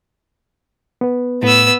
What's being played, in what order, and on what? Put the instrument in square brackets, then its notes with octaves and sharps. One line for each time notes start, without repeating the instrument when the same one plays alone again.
[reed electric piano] B3 B4
[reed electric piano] A2 [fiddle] B3 E6